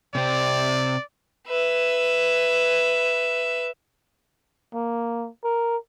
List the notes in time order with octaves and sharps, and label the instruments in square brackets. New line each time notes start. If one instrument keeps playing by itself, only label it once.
[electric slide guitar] C3 C4 [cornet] D5
[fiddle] B4 E5
[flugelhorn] A#3
A#4